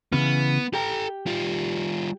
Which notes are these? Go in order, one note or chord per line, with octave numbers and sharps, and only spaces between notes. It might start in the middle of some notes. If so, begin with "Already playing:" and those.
C#3 E3 B3 C#4
G4 A4 G5 A#5
G3 F4